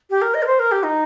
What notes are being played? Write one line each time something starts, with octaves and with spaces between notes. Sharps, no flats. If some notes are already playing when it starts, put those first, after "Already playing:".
G4
A#4
D#5
A#4
C5
A#4
G4
D#4